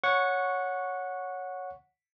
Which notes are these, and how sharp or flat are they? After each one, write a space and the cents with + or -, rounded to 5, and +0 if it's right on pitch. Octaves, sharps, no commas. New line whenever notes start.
C#5 +5 F#5 -15 C#6 +0